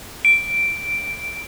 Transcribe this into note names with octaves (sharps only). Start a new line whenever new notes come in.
D7